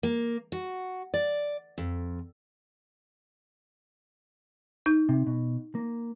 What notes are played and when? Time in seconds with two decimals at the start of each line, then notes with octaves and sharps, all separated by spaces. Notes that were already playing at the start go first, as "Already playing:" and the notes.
0.03 A#3
0.52 F#4
1.14 D5
1.78 F2
4.86 D#4 G6
5.09 C3
5.27 B2
5.75 A#3